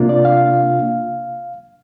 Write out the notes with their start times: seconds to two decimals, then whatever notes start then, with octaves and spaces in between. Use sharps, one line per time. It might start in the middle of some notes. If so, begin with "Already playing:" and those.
Already playing: C3 A#3 D4 F4
0.09 D5
0.25 F5